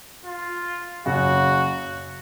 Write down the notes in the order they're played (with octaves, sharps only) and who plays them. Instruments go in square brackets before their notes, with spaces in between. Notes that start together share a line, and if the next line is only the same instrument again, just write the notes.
[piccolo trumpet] F4
[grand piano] F#1 F#2 C#3 [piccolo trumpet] F#4